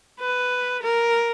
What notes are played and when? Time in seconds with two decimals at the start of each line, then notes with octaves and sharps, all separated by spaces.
0.21 B4
0.82 A#4